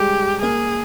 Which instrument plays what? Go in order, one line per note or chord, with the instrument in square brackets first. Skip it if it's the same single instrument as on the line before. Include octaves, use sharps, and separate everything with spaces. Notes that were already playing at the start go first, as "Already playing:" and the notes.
Already playing: [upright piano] G3 G#3 [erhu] G4
[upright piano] A#3 [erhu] G#4